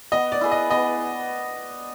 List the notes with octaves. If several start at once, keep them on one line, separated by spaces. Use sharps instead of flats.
B3 D#5
D5
E4 G#4 B4
D#5
B3 D#5